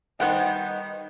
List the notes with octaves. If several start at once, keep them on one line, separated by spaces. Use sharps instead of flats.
D#3 G3 B3 C5 F#5 G5